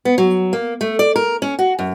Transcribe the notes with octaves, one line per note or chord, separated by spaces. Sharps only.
B3
F#3
A#3
A3
D5
A#4
C#4
F#4
F#2